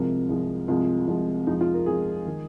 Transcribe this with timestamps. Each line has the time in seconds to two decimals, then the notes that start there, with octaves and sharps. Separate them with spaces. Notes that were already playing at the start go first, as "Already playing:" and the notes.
Already playing: C2 C3 F3 G#3 A#4
0.28 C2 C3 F3 G#3
0.68 C2 C3 F3 G#3 F4
1.07 C2 C3 F3 G#3
1.46 F2 F3 G#3 D#4
1.61 F4
1.74 A#4
1.86 F2 F3 G#3 G#4
2.26 D#3 G#3